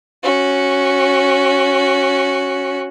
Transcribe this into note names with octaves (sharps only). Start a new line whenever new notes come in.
C#4 F#4